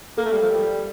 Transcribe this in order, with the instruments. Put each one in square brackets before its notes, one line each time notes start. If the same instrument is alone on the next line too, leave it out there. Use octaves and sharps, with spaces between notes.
[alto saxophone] A#3 [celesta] A4
[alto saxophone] A3
G3
F3
G3